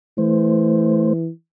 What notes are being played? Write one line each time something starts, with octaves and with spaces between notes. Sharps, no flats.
E3 A3 C5